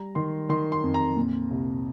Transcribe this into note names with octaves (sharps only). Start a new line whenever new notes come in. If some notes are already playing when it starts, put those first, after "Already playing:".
Already playing: G3 A#5
D#3 C6
D#3 C6
C6
F2
A#5
A#2
C2